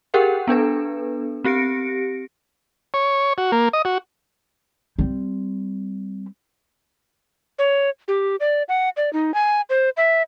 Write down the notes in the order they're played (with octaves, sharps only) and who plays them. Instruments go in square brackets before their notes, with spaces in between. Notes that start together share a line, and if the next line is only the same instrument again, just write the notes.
[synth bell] G4 G#4 A#4 F#5 G5
B3 D4 A4 B4
C4 G4 A#6 C#7 D7
[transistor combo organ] C#5
F#4
A#3
D#5
F#4
[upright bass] G3 C4
[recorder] C#5
G4
D5
F#5
D5
D#4
G#5
C5
E5